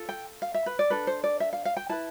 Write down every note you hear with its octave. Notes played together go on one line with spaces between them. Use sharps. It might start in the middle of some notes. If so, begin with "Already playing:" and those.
Already playing: F4 A4
G5
F5
E5
B4
D5
D4 A4 B4
C5
D5
E5
F5
F5
G5
E4 B4 A5